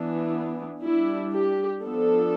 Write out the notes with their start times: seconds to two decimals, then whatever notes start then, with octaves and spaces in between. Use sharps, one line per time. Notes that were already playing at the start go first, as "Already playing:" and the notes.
Already playing: E3 B3 D4
0.83 G3 D4 E4
1.33 G4
1.82 F3 B3 D4 A4